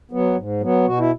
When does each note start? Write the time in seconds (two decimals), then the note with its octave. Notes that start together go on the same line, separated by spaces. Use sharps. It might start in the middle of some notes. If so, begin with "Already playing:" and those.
0.11 F#3 B3
0.37 G#2
0.61 F#3 B3
0.86 B2 F#4
0.99 E4